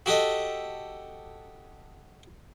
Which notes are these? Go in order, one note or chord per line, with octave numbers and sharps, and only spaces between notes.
F#4 G4 A4 D#5